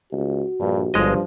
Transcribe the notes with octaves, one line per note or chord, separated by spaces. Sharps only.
C#2 F#4
A#1 G2
G1 G2 F3 G#3 D#5